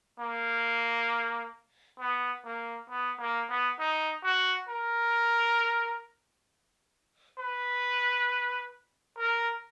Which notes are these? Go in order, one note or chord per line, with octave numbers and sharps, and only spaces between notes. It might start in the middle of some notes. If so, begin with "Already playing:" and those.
A#3
B3
A#3
B3
A#3
B3
D#4
F#4
A#4
B4
A#4